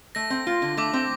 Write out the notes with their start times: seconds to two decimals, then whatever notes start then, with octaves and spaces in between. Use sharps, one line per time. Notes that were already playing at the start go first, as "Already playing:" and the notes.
0.15 A3 A#6
0.30 C4
0.47 F4
0.62 D3
0.77 A3 D6
0.93 C4